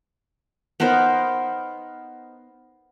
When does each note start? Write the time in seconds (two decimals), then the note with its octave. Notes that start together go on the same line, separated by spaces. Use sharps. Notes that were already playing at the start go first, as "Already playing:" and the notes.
0.80 B3 D#4 A#4 C5